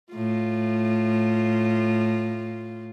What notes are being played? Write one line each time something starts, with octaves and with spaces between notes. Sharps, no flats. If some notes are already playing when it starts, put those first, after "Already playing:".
A2 F4